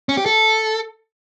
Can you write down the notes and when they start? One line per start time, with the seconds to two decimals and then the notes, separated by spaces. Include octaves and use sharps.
0.09 C#4
0.17 G4
0.26 A4